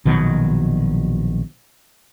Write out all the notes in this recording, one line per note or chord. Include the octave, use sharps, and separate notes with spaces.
A#1 B2 D#3 F#3